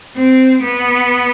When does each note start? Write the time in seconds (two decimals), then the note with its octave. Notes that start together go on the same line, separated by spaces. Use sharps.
0.16 C4
0.62 B3